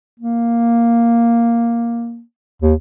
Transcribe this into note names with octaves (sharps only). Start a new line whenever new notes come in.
A#3
D#2